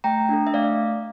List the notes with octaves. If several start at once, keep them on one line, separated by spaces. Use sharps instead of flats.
A3 G5 A#5
D4 A4
E5
A3 D5 F5